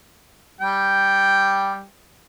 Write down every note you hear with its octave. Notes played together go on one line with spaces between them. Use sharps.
G3 G5